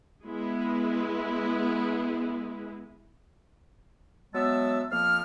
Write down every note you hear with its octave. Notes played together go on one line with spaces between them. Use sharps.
G#3 B3 E4
F#3 G#3 B3 E5 A5 E6
F2 F3 A#3 F6